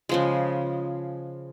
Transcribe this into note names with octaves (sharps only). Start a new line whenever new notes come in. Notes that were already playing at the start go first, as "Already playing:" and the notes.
C#3 F3 G#3